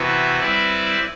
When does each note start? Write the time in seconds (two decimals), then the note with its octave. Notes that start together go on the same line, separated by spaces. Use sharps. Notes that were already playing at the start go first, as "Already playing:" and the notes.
Already playing: C3 E3 B3 F#4 B4
0.40 G3 C4 E4 B4 D5